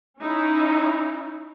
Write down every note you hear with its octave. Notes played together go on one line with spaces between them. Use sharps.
C#4 D#4 E4